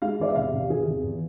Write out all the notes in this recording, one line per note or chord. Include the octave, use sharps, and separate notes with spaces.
G#3 F5
E2 D5
E5
C3 F5
C3
E2 G#4
E2
E2